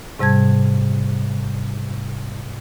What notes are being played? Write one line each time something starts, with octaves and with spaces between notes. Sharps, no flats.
G#2 C3 G3 A5 G#6